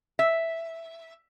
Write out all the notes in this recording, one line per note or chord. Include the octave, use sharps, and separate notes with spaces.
E5